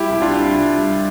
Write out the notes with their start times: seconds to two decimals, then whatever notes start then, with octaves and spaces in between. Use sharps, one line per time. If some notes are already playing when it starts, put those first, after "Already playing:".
Already playing: G3 E4 G4
0.10 C2
0.22 D4 F4
0.33 C2
0.55 C2
0.78 G3